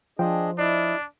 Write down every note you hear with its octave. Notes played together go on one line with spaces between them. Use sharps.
F3 D4 G#4 C5 D#5 G5
D4 E4 D5 D#5